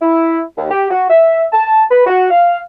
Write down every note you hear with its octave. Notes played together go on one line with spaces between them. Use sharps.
E4
D#2
G4
F#4
E5
A5
B4
F#4
F5